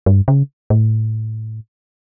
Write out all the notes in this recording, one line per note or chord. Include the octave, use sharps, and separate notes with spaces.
G2
C#3
A2